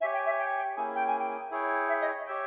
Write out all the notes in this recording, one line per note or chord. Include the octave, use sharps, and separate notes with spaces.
G4 C#5 E5 G#5
G5
E5
G5
G5
A#3 C#4 E4 G#4 G#5
G5
G#5
G5
E4 G#4 C#5 G5
E5
D#5
G4 C#5 E5 G5